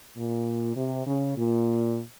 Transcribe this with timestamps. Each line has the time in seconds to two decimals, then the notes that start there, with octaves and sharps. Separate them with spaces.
0.17 A#2
0.76 C3
1.07 C#3
1.37 A#2